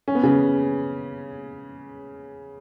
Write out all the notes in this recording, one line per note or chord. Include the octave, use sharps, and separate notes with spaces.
C#4
B3
C#3 C#4